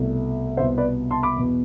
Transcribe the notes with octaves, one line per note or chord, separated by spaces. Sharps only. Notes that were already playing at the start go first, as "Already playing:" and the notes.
Already playing: C2 B2 A3
C2 B2 B3 C5 E5
B4 D5
A5 C6
B5 D6
E2 B2 B3